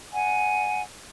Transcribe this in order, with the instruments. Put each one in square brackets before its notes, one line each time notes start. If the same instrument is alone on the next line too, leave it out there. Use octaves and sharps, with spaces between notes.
[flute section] D5 F#5 G#5